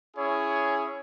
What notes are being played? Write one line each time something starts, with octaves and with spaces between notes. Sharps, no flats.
C#4 E4 G#4 C#5